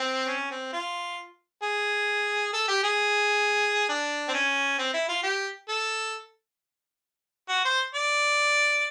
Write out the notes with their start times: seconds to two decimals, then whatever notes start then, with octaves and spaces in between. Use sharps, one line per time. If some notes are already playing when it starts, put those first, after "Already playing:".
Already playing: C4
0.27 C#4
0.51 C4
0.73 F4
1.63 G#4
2.53 A4
2.68 G4
2.83 G#4
3.89 D4
4.28 C4
4.34 C#4
4.78 C4
4.93 E4
5.09 F4
5.23 G4
5.69 A4
7.49 F#4
7.65 C5
7.95 D5